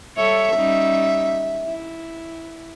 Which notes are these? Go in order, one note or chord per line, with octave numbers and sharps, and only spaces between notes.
G3 A4 C#5 E5
G3 C#4 D#4
E4